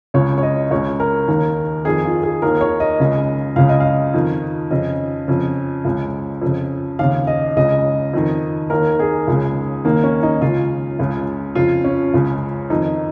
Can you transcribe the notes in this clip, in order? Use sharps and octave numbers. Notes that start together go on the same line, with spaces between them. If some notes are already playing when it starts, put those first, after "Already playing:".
C#2 C#3 C#5
C#5
D#5
C#2 C#3 C#5
A#4
D#2 D#3
F2 D#3 G#4
F4
G#4
D#2 D#3 A#4
C#5
D#5
C#2 C#3
C#2 C#3 F5
D#5
F5
F2 D#3
F2 C#3 D#5
F2 C#3
C#2 C#3
F2 C#3
D#2 C#3 F5
D#5
C#2 C#3 D#5
F2 D#3
D#2 D#3 A#4
G#4
C#2 C#3
D#2 D#3 A#3
C#4
D#4
C#2 C#3 F4
C#2 C#3
F2 C#3 F4
C#4
C#2 C#3
F2 D#3 D#4